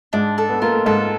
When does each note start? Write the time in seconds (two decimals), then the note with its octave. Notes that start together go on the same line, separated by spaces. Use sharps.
0.13 G#2 G#3 D4
0.38 A4
0.50 B3
0.62 A#3 F4
0.74 A3
0.86 G#2 G#3 A4